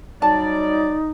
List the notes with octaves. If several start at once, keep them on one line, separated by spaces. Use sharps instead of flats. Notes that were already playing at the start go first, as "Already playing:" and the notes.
F#3 G3 D#4 D5 A5